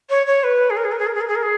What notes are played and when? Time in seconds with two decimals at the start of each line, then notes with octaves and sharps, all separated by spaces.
0.10 C#5
0.26 C#5
0.43 B4
0.70 G#4
0.76 A#4
0.84 G#4
0.92 A#4
0.99 G#4
1.07 A#4
1.14 G#4
1.21 A#4
1.28 G#4
1.35 A#4
1.42 G#4